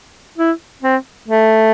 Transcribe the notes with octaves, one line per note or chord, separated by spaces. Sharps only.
E4
C4
A3